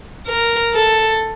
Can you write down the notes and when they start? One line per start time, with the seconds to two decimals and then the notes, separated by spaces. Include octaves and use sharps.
0.27 A#4
0.74 A4